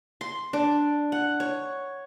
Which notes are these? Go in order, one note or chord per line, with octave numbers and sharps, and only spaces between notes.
C6
D4
F#5
C#5